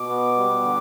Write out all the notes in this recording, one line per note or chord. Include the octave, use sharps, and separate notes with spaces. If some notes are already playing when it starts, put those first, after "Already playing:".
Already playing: B2 D6
B3
G3
D3